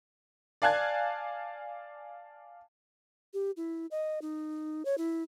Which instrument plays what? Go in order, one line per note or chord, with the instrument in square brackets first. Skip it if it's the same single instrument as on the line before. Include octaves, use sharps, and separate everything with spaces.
[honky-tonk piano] D5 F5 G#5 A5 F#6 G#6
[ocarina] G4
E4
D#5
D#4
C#5
E4